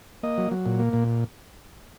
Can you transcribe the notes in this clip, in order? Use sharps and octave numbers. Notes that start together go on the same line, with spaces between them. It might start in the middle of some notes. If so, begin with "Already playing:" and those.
A#3 D#5
F#3
F#3
A#2
A#3
A#2